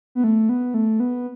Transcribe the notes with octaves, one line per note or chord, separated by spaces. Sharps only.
B3
A3
B3
A3
B3